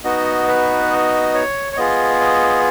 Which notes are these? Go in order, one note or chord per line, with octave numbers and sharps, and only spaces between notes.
B3 D#4 F#4 D#5
B4
D#5
C#5
C#5
B3 F4 G#4 D#5
D#5